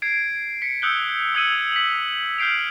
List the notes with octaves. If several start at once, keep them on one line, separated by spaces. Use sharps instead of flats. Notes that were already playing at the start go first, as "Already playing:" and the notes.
G#6 C7 D7
B6 C#7
D#6 E6 F#6 G6 C#7 G7
D#6 E6 G#6 C#7 D#7 F#7
B6 F#7
F6 G6 C7 D7 F7